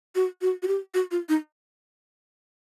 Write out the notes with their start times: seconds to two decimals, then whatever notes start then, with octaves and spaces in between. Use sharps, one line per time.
0.15 F#4
0.42 F#4
0.63 F#4
0.68 G4
0.94 F#4
1.11 F4
1.29 D#4